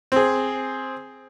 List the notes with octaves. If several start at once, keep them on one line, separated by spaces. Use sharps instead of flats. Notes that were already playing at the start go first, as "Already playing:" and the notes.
C4 G#4